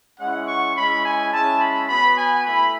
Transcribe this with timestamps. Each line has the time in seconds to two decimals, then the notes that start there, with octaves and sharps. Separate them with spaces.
0.19 G#3 C#4 E4 F#5
0.47 C#6
0.75 G#3 C#4 E4 B5
1.04 G#5
1.32 G#3 C#4 E4 A5
1.60 B5
1.88 B3 F#4 B5
2.16 G#5
2.44 A3 E4 B5